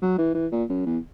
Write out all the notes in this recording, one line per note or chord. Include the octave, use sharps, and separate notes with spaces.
F#3
E3
E3
A#2
F#2
E2